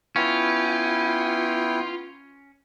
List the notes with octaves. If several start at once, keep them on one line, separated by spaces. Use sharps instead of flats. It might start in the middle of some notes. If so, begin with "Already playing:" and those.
B3 C#4 E4 F4 G5